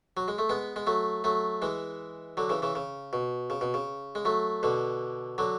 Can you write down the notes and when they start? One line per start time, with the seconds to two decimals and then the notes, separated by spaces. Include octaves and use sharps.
0.17 F#3
0.28 G#3
0.38 A3
0.49 G#3 B3
0.76 G#3
0.87 F#3 A3
1.24 F#3 A3
1.62 E3 G#3
2.37 D3 F#3
2.49 C#3 E3
2.62 C#3 E3
2.75 C#3
3.13 B2
3.50 C#3
3.61 B2
3.74 C#3
4.15 G#3
4.25 F#3 A3
4.63 B2 D3
5.38 D3 F#3